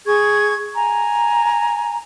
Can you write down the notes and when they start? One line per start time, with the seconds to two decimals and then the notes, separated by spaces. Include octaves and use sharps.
0.07 G#4 C#6 G#6
0.75 G#5 A#5